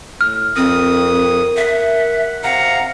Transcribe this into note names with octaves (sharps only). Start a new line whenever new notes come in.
A2 F6
F2 C4 A#4 D#6
E5 F#5
C3 F5 F#5 A#5